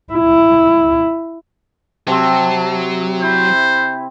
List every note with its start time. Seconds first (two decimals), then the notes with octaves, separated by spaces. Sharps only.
0.13 E4
2.07 C3 F#3 C4 A5
3.22 E4 C5